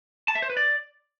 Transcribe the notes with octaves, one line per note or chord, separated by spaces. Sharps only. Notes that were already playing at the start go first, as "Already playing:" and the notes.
A5
E5
C5
B4
D5